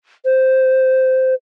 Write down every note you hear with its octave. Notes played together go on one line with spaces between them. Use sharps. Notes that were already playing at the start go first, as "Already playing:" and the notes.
C5